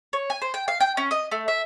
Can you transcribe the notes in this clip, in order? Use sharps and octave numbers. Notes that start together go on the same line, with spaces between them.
C#5
G#5
C5
G5
F5
G5
C#4
D#5
A3
E5